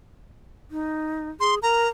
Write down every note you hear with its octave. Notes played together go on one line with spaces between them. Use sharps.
D#4
G#4 C6
A#4 A#5